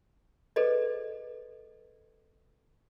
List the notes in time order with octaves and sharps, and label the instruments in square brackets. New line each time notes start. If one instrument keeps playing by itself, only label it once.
[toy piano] G#4 A4 B4 C5 D5 D#5